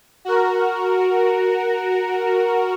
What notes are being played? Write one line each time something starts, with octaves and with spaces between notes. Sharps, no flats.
F#4 A#4